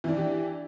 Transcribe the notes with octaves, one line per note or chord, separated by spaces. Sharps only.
E3 D4 E4 G4